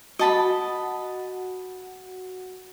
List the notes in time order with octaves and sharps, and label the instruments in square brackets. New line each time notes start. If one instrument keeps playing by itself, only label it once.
[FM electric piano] F#4 F#5 [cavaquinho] D#5 A5 B5